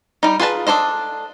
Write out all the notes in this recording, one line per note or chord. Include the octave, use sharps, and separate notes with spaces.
G3 D#4
F4 G#4 B4 A5
D4 A4 C5 D#5